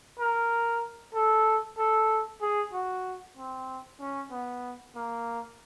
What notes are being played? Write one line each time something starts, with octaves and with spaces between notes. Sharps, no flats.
A#4
A4
A4
G#4
F#4
C4
C#4
B3
A#3